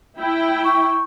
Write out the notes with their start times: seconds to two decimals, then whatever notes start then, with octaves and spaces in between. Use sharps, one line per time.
0.18 E4 G5
0.64 C#6